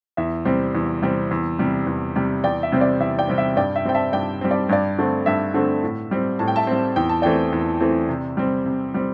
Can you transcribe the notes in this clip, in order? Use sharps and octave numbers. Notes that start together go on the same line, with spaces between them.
E2 E5
C3 G3 C4
E2
C3 G3 C4
E2
C3 G3
E2
C3 G3
E2 D5 G5
E5
C3 G3 C4
D5
E2 E5
D5 G5
C3 G3 C4
E5
G2 D5 G5
E5
G3 C4 G5
E5 A5
G2 D5 G5
G3 C4
D5
G2 D5
D3 A3 C4
G2 E5
D3 A3 C4
A2
G3 C4
A2 A5
G5
E5 A5
G3 C4
E2 G5
A5
E3 A3 C4 D5 G5
E2
E3 A3 C4
C3
G3 C4
C3
G3 C4